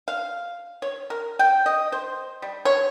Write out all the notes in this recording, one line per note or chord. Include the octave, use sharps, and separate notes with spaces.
F5
C#5
A#4
G5
D#5
C5
G3
C#5